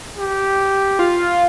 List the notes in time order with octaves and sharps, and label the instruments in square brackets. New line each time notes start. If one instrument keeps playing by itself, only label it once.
[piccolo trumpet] G4
[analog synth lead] F4